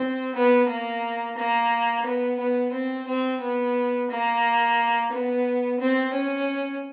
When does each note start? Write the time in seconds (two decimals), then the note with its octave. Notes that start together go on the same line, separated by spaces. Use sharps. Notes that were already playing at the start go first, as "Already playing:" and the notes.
Already playing: C4
0.35 B3
0.68 A#3
1.38 A#3
2.05 B3
2.40 B3
2.73 C4
3.07 C4
3.41 B3
4.10 A#3
5.12 B3
5.80 C4
6.13 C#4